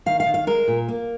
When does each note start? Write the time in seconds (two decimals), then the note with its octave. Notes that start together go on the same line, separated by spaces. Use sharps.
0.06 D#3 F5
0.20 F5
0.26 D#3
0.34 F5
0.47 G#3 A#4
0.68 A#2
0.88 A#3